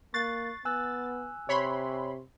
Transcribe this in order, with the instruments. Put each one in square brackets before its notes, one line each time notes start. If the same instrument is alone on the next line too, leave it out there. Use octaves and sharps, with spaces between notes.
[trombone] A#3 [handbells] C#6 F#6 C7 [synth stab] A6
[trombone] B3 [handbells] G#5 E6 F#6
[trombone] C3 [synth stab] C#5 B5 C6